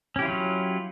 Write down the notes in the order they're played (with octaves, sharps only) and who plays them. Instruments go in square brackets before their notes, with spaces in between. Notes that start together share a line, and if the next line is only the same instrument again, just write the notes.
[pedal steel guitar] C#4
G4
E4
F4
F#3